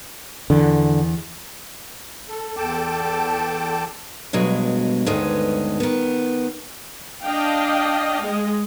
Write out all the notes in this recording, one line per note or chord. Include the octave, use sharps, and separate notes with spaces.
E2 D3
A4
E2 A4 G5 A5 D6
D2 G2 B2 F#3 G#3
D2 G2 D#3 G#3 B3 C#4
D#3 B3
D4 D#5 F5 G5
G#3 D#5